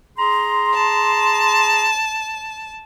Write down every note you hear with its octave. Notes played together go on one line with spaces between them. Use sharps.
G#4 A#5 C6
A5